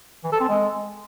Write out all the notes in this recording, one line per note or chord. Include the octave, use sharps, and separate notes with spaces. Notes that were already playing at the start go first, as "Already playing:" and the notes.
E3
A4
C4
G#3